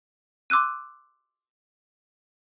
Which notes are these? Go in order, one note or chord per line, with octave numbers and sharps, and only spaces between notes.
C6 D6 E6 F#6 D#7